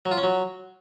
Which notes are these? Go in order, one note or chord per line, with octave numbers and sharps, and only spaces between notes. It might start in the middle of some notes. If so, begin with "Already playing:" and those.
F#3
F4
C#4
F#3